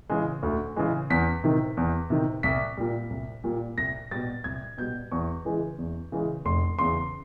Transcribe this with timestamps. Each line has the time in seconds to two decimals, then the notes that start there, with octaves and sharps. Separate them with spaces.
0.10 C#3 E3 G#3
0.43 D2
0.76 C#3 E3 G#3
1.10 E2 B6
1.44 C3 D#3
1.77 E2
2.10 C3 D#3
2.43 C2 B6
2.77 A#2 G3
3.10 C2
3.44 A#2 G3
3.77 C2 A#6
4.11 B2 G3 A6
4.44 C2 G#6
4.78 B2 G3 G6
5.11 E2 C#6
5.45 C#3 E3 G#3
5.78 E2
6.12 C#3 E3 G#3
6.45 F1 C6
6.79 E2 C#3 C6